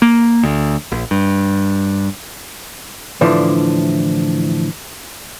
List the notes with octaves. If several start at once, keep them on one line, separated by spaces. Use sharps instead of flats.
A#3
D2
A#1
G2
A2 D3 E3 F3 D4